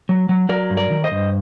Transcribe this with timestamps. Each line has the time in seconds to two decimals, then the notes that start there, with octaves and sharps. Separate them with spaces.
0.09 F#3
0.29 F#3
0.49 F#3 A#4 D5
0.70 G2
0.77 A#4 D5
0.90 D#3
1.04 C5 D#5
1.11 G2